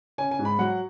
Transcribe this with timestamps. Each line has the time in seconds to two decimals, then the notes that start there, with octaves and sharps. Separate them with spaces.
0.18 C#4 G#5
0.31 G#5
0.39 G#2
0.45 B5
0.59 F#3 F#5